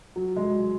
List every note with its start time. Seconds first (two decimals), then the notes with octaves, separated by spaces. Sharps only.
0.16 F#3
0.36 G#3
0.43 F#3